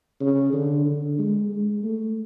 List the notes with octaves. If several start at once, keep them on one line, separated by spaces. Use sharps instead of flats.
C#3
D3
D3
G#3
G#3
A3